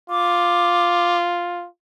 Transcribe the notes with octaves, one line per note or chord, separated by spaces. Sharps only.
F4 D6